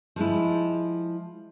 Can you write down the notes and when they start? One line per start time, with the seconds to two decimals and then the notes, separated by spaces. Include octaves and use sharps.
0.16 F3 G#3 E4